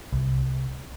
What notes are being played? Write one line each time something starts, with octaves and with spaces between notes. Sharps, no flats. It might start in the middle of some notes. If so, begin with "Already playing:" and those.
C2